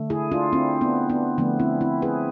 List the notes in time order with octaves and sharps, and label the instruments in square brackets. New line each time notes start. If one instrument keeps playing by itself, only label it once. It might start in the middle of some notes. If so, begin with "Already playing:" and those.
Already playing: [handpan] D3 A3
E4 G#4
D4 F4
C4 E4
B3 D4
B3 D4
D3 F3 A3 B3 D4
C4 E4
C4 E4
G#4 B4